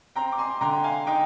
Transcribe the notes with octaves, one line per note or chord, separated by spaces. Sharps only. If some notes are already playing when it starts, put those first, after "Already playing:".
C4 G5 A#5
D6
G#5 C6
D3 G5 A#5
F5 G#5
D#4 G5